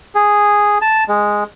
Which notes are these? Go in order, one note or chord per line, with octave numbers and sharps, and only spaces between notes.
G#4
A5
G#3